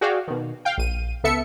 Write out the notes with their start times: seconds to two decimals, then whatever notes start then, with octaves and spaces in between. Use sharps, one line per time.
0.01 F#4 G#4 D5 F5 G5
0.27 B2 D#3
0.65 F5 G5
0.78 A#1 D#7
1.24 C#2 B3 A4 E5 C#7